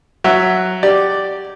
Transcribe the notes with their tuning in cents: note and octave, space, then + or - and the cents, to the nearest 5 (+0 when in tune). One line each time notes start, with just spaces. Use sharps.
F#3 +0 E5 +0
G4 -10 D5 +0